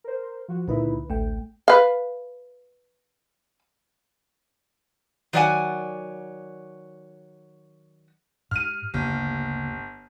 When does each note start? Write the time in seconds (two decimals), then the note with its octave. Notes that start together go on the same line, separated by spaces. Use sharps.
0.04 A#4 C5
0.48 F3 F#4
0.68 C#2 A#2 D3 D#4 E4 B4
1.09 A1 D2 A3 G5
1.68 B4 F5
5.33 D#3 F#3 D5 F5 F#5 G#5
8.51 G#2 F6 D#7
8.94 G1 D2 C#3 A#3